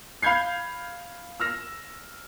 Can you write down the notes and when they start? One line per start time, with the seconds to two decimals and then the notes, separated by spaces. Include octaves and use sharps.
0.23 F5 B5 G6 G#6 C7
1.40 E6 F6 A#6